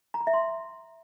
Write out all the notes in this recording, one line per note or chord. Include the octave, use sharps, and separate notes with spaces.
A#5
B5
E5
C6